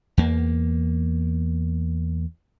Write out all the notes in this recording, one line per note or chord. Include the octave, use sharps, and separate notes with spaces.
E2 A#3